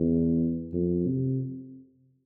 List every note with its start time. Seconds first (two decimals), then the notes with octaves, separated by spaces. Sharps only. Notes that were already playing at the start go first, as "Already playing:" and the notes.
Already playing: E2
0.73 F2
1.07 C3